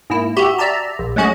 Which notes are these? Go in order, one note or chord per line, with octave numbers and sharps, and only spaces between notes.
G#2 A#3 E4
F#4 G4 E5
D5 E5 A5 A#5
A#1
F#3 G#3 A3 C#4 F#4 D#5